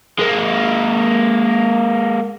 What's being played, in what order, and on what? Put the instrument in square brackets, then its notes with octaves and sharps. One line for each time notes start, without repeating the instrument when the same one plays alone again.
[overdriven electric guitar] G#3 A#3